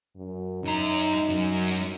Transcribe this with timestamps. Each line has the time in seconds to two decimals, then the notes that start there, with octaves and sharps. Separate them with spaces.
0.16 F#2
0.64 F#2 D#4 A#5
1.30 F#2